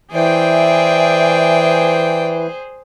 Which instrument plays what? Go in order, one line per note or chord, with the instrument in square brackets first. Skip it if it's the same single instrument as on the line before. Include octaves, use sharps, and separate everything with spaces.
[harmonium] E3 [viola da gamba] G#4 C5 [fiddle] D5 G5 [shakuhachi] E5